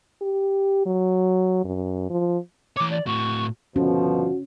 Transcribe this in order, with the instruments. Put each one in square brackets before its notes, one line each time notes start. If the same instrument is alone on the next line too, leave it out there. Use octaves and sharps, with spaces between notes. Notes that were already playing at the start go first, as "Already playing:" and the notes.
[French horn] G4
F#3
F#2
F3
[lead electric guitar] E3 C#5 [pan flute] D6
[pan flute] D5
[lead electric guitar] A2 F#4 [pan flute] C#6
[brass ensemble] G1 B2 F3 [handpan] C#4 [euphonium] F#4